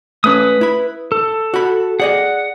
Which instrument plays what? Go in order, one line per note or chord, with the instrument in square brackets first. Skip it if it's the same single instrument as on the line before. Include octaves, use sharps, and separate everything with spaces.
[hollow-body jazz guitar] A3 C#4 [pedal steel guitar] B4 D#6
[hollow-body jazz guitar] E4 B5
[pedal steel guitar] A4
[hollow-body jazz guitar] F#4 B5
[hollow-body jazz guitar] G#4 D5 D#5 [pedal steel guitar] F#5